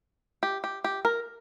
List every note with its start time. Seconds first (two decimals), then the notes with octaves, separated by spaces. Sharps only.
0.43 G4
0.64 G4
0.84 G4
1.05 A#4